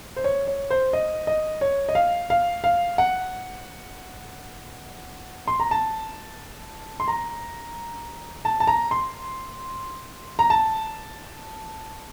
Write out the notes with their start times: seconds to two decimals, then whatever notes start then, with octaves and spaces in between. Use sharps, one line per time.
0.16 C5
0.24 C#5
0.47 C#5
0.70 C5
0.93 D#5
1.27 D#5
1.61 C#5
1.89 D#5
1.95 F5
2.30 F5
2.64 F5
2.98 F#5
5.48 C6
5.60 A#5
5.71 A5
7.00 C6
7.08 A#5
8.45 A5
8.60 A5
8.67 A#5
8.91 C6
10.39 A#5
10.50 A5